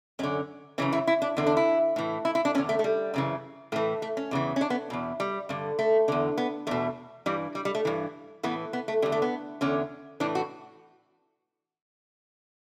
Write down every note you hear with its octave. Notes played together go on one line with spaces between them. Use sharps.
F#2 D3 C#4
F#2 C#3 E3 C#4
E4
E4
D4
E2 D3
D4
E4
A2 E3
E4
E4
D4
E2 D3 C#4
A3
A3
G3
F#2 C#3 E3
A2 E3 A3
A3
C#4
E2 C#3 E3
C#4
D4
B3
E2 B2
G3
G2 D3
A3
E2 D3
B3
E2 B2 A3
G2 E3 G3
G3
G3
A3
G2 E3
A2 E3 B3
B3
A3
E2 D3 G3
A3
B3
E2 D3 C#4
A2 E3 D4
F#4